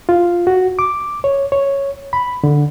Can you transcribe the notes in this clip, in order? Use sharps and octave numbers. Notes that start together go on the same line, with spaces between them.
F4
F#4
D6
C#5
C#5
B5
D3